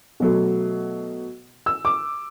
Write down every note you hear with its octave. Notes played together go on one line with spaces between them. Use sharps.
B2 F#3 A3
E6
D6